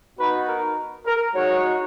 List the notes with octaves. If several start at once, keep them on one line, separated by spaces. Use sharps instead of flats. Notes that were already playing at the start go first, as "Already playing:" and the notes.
B3 D#4 F#4 B4
A#4
A#4
G#3 D#4 F#4 C#5